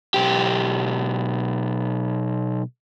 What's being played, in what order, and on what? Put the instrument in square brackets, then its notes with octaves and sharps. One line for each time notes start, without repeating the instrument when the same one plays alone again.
[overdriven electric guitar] B1 G4